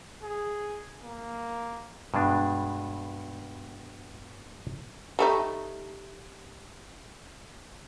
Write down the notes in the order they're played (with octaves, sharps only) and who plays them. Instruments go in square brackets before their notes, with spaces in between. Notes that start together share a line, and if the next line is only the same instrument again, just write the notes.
[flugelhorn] G#4
A#3
[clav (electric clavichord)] G2 B2 G#3 D4
[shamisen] G3 A3 D#4